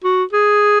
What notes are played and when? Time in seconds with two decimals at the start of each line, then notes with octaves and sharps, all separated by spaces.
0.04 F#4
0.32 G#4